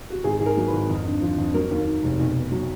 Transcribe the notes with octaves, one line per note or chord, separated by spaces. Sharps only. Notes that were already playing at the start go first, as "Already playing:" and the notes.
F#4
G#1 G#4
G#2 G#4
A#4
F#3
B4
G#1
F2
D3
F3
F2
F#3 A#4
D#2
D#3
F1
B1
B2
F#3